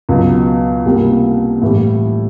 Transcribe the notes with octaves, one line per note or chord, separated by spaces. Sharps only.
C#2 B2 F#3
C2 B2 G3 A#3
A2 E3 G3